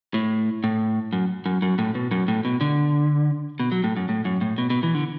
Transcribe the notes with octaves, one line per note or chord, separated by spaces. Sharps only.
A2
A2
F#2
F#2
F#2
A2
B2
F#2
A2
B2
D3
B2
F#3
A2
F#2
A2
F#2
A2
B2
B2
E3
D3